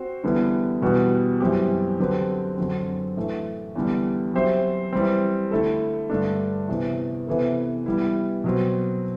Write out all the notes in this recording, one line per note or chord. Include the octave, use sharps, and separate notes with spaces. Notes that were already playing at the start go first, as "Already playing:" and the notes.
Already playing: C4 F#4 C5
E2 D3 G3 B3 E4
E2 B2 G3 B3 F#4
F#2 E3 G3 C4 G4
D3 F#3 C4 G4 B4
F#2 D3 F#3 C4
A2 E3 A3
E2 D3 G3
F#3 C4 G4 C5 E5
E3 G3 C4
D3 A3 E4 A4
G2 D3 A3 D4
E2 C3 E3
C3 E3 B3 E4 A4
E3 G3 B3 E4
B2 F#3 C4